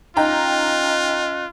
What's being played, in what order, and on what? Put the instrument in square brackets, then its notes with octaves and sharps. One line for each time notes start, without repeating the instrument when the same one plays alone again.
[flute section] C#4 D#5 F#6 [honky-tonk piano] D#4 G5 A#5 [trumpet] F4